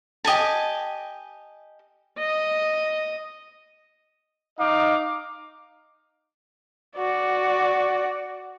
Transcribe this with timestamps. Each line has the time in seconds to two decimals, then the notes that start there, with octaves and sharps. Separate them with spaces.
0.25 G4 D#5 G#5 A5
2.19 D#5
4.59 D#4 D#5 F5 D6
6.97 F#4 D5